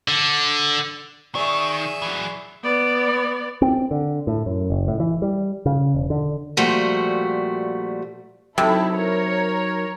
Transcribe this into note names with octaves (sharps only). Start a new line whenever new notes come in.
D3
D#3 G#4 D5 E5 C#6
E3 F#3
B3 D5
C4
D3
A2
F#2
F#1
A2
E3
G3
C#3
E1
D3
A#2 F3 G3 A3 F#4
C3 F#3 D#4 E4 A4
A#4 C#5